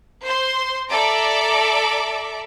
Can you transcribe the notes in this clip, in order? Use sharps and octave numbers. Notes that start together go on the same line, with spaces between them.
C5 C6
A4 D5 E5 A#5 D6